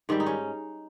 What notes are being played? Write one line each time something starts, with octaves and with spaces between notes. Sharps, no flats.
G#2 D#3 G3 C4
D#4
C#4